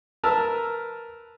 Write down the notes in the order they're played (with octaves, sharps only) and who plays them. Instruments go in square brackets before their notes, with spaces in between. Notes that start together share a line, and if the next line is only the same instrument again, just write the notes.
[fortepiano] A#4 B4 A5 E6 F6